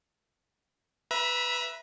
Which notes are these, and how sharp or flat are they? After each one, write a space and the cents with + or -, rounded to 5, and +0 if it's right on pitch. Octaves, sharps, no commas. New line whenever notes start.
B4 +0 E5 +5 A#5 +40